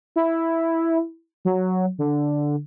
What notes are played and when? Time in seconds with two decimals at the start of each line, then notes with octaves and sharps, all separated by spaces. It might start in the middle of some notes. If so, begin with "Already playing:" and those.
0.16 E4
1.45 F#3
1.98 D3